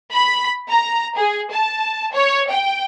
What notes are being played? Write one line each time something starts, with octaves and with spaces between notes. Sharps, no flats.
B5
A#5
G#4
A5
C#5
G5